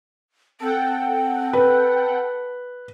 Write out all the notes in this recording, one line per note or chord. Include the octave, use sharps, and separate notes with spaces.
C4 A4 F#5 G5
B4